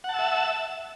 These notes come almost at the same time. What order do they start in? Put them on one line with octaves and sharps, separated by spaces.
F#5 A5 E6 E5